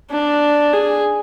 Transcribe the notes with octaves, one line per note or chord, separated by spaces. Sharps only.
D4
G#4